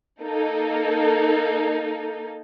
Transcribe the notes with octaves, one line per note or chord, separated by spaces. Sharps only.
A#3 D#4 A4